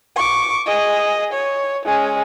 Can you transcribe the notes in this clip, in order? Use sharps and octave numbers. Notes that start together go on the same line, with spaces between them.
C#6 D6
G#4 D#5
C#5
G#3 C#4